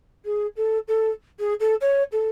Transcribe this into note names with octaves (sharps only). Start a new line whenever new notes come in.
G#4
A4
A4
G#4
A4
C#5
A4